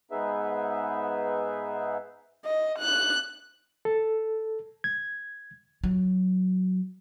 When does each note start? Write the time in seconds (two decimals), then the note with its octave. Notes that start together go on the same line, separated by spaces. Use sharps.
0.11 G#2 B3 D#4 G#4 B4 E5
2.45 D#5
2.79 F#6
3.85 A4
4.84 G#6
5.84 F#3